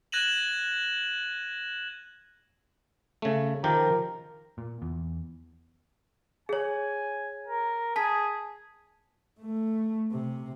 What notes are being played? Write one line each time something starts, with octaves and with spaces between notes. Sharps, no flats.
F#6 G#6 A#6 D#7 E7 F#7
C#3 A3
D#3 F3 G4 A#4
A#2
E2
G#4 C#5 G#5
A#4
G#4 A5 B6
A3
C3